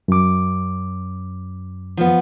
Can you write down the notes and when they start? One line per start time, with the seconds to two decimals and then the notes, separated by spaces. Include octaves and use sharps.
0.08 F#2 D6
1.97 F3 B3